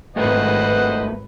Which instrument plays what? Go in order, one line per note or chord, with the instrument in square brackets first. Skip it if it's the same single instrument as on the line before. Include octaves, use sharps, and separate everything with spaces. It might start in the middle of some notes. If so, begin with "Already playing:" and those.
[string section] G#1 B4 [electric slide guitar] G2 A3 A#3 [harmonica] C5 D#5 F#5